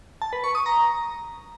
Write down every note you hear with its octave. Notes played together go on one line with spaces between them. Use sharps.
A5
B4
C#6
D#6
A#5